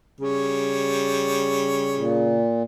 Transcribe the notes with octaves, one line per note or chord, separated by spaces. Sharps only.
C#3 G3 C#5
A#2